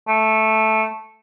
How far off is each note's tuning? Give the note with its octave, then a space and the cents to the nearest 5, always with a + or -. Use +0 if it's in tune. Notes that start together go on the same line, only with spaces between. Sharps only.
A3 -5